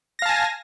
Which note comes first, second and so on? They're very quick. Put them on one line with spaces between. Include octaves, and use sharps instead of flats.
A#6 F5 A5 G#5